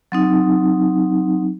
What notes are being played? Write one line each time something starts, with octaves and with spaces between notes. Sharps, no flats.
F#3 C4 D#4